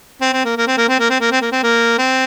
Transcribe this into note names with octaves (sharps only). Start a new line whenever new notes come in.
C4
C4
A#3
A#3
C4
A#3
C4
A#3
C4
A#3
C4
A#3
C4
A#3
C4